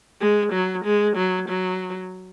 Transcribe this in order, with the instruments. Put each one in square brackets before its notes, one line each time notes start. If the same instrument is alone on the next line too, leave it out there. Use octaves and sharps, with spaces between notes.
[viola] G#3
F#3
G#3
F#3
F#3